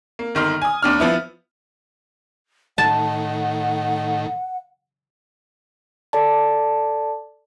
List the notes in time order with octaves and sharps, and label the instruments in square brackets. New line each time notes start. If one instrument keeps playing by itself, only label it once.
[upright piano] A#3
G1 D#3 C6 F6
G#5 D#6
D#2 D4 F6
F3 B3 E4
[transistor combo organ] A2 D#3 [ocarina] F#5 [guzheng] A5
[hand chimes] A4 D5 A5